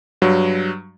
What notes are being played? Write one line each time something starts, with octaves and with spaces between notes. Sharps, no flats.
G2 F#3